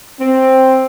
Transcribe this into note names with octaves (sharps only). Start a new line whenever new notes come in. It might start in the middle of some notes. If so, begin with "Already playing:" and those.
C4